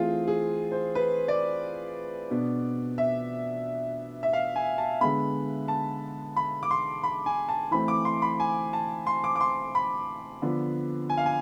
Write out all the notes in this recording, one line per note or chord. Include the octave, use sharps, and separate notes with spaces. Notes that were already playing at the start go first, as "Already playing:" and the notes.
Already playing: E3 A3 C4 F4 G#4
G#4
C5
B4
D5
B2 B3 D4
E5
E5
F5
G#5
A5
D3 G#3 B3 B5
A5
B5
D6
C6
B5
G#5
A5
E3 A3 C4 B5
D6
C6
B5
G#5
A5
C6
D6
D6
C6
B5
D3 F3 B3 D4
G#5
F5
G#5